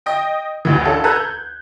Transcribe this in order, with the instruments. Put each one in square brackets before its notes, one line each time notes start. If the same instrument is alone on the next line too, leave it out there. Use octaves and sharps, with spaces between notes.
[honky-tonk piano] D#5 G5
A1 D2 E3
C#4 D4 F4 A4
A4 B4 A#5 E6 F#6 G#6
G6